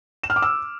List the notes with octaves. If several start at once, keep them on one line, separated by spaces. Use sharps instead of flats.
E7
F6
D6
E6